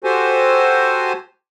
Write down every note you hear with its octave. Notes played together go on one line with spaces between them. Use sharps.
F#4 G4 A4 C5 G#5